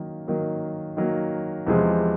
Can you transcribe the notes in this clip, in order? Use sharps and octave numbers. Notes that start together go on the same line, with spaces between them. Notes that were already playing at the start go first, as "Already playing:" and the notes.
Already playing: D#3 F#3 A#3
D#3 F#3 A#3
D#3 F#3 A#3
E2 C3 F3 G#3